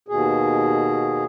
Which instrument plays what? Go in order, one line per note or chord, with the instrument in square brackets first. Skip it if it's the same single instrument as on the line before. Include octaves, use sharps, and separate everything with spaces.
[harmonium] D#2 B2 G#4